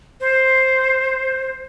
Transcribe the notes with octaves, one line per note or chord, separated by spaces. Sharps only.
C5